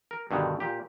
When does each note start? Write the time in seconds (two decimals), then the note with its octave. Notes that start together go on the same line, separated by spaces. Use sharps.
0.11 A#4
0.31 G2 B2 D3 D#3
0.60 A#2 G4